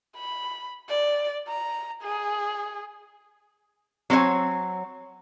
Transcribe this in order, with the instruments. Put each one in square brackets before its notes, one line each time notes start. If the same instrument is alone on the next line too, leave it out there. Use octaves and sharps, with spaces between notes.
[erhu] B5
D5
A#5
G#4
[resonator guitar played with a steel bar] F#3 C4 F#4 C#5 G#5